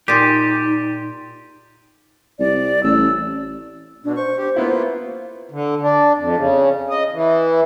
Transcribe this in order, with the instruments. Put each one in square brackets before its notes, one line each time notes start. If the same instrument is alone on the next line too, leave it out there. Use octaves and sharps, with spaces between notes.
[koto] A#2 G#4 [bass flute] D#4 [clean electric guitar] G4 [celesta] C6 A6 D#7
[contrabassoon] C2 [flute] D5
[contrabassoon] A1 [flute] E6
[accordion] B2 [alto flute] D4
[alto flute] C5 [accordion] C#6
[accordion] G4
[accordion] A#3 F4 [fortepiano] B3 E4
[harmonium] D3
D4
F2
C#3
D#5
E3